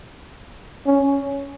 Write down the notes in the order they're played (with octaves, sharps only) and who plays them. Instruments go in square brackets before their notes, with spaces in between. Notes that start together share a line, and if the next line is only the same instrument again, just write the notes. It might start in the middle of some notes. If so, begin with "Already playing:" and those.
[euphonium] C#4